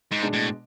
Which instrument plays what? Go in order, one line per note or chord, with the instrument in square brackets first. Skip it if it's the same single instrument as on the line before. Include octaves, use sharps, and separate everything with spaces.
[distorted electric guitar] G#2
[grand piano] B2 G#3 D4
[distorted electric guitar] A2